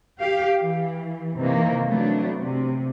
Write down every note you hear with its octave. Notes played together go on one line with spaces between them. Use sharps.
G4 F5
E3
C3 D#3 E3 A#3
F#3 A3 B3 D4
C3